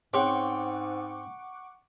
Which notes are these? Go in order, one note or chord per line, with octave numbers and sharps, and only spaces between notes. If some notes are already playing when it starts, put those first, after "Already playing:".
G#2 C4 C#4 G#4 C#5 F#5 C#6 D6